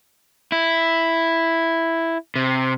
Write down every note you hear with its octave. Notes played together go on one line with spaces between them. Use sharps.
E4
C3